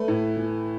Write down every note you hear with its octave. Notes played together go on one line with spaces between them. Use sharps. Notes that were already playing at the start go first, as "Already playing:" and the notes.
Already playing: A3 B4
A2
E3